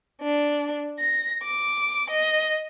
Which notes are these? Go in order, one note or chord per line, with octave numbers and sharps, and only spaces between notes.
D4
A#6
D6
D#5